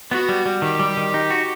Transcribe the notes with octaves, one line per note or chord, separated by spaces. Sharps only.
B3 F#4
G3
G3
D#3 G4
G3
D#3
D#4
F#4